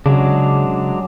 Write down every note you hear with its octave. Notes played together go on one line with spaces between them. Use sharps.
C#3 F#3 G#3 D4